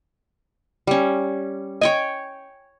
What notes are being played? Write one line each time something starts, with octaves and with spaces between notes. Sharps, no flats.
G3 C#4
C#5 D#5 G5 G#5